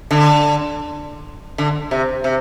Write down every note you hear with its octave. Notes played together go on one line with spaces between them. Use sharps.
D3
D3
C3
C3